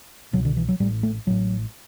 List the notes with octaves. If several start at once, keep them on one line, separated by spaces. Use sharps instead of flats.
C2 B2 F#3
D3
E3
F#3
A1 A2 G3
A3
A1 A2 F#3